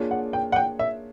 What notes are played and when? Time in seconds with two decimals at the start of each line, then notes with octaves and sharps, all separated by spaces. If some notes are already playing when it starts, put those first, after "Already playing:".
Already playing: A#3 D4 F4 G#4 C#5
0.11 F#5
0.33 G5
0.52 F#5
0.56 G5
0.79 E5